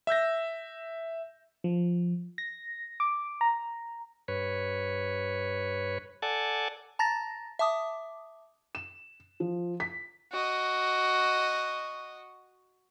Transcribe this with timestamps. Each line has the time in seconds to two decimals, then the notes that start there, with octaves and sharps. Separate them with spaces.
0.07 E5 E6 G6 A#6
1.64 F3
2.38 A#6
3.00 D6
3.41 A#5
4.28 G2 B4 C#5
6.22 A4 D5 F#5 G#5 A5
6.99 A5 A#5 A6 A#6
7.59 E5 A5 D6 D#6
8.75 E7
9.40 F3
9.80 B6
10.32 F#4 D#5